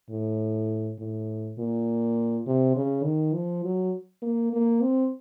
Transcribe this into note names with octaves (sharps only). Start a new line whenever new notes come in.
A2
A2
A#2
C3
C#3
D#3
F3
F#3
A#3
A#3
C4